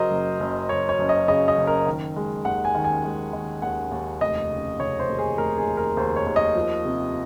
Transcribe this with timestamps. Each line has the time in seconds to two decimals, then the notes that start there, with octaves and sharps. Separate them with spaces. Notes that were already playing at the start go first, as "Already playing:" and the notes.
Already playing: C#3 F#3 A#4 C5 D#5
0.11 F#1
0.40 F#1
0.69 F#1 C#5
0.89 C#5
0.99 F#1
1.09 D#5
1.28 C#3 D#5
1.48 D#5
1.57 F#1
1.67 A#4
1.87 D#3
2.16 G#3
2.45 D#2 F#5
2.65 G#5
2.75 D#3
2.84 G#5
3.04 G#3
3.33 D#3
3.62 D#2 F#5
3.91 D#2
4.21 F1 D#5
4.50 C#3
4.79 F1 C#5
4.99 C5
5.09 D#2
5.19 G#4
5.38 F1 A#4
5.58 G#4
5.67 D#2
5.77 A#4
5.97 D#2 C5
6.16 C#5
6.26 D#2
6.36 D#5
6.55 F3
6.85 C3